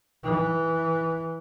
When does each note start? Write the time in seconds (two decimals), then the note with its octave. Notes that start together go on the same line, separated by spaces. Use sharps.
0.23 E3